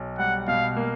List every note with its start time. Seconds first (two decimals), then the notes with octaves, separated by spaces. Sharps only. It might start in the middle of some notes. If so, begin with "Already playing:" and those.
Already playing: B1
0.18 G3 F#5
0.48 B2 F5
0.76 A#3